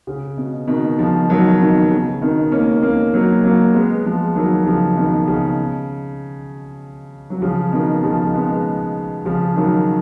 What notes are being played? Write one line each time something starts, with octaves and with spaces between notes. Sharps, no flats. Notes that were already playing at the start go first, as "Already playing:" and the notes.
C#3
B2
B2 D#3
C#3 F3
D#3 F#3
B2 D#3
C#3
B2 D#3
A#3 C#4
A#3 C#4
F#3 A#3
F#3 A#3
G#3 B3
F3 G#3
D#3 F#3
C#3 F3
B2 D#3
C#3
F#3
C#3 F3
B2 D#3
C#3 F3
G#3 B3
C#3 F3
D#3 F#3